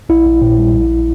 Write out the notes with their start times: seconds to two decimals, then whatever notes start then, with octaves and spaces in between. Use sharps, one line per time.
0.09 A#1 E4
0.26 A#1
0.42 A#2
0.58 G3
0.74 A#1